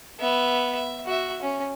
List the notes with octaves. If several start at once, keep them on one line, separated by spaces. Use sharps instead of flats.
B3 E5
E5
F#4 E5
C#4